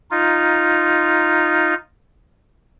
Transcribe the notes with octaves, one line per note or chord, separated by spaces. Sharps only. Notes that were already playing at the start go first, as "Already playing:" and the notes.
D#4 F4